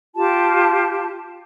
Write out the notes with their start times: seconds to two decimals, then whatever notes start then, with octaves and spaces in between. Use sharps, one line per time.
0.16 F4 G4 A5